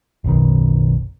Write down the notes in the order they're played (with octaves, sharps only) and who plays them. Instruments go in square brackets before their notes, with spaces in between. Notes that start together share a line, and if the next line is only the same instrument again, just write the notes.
[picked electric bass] F#1 B1 D#3